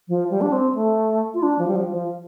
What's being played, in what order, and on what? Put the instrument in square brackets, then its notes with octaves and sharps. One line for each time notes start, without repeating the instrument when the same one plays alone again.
[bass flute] F3
G3
D4
C4
A3
F4
D4
F3
G3
F3
F3